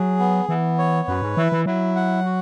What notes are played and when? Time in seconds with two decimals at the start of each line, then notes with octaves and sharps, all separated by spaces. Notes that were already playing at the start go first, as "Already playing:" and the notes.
Already playing: F#3 G#4
0.19 B3
0.49 E3 B3
0.78 C#5
1.08 F#2 B4
1.22 G#2
1.37 E3 E4
1.52 E3
1.66 F#3 E4
1.96 F#5
2.25 F#4